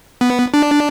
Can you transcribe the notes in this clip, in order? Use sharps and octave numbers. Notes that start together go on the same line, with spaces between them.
B3
D4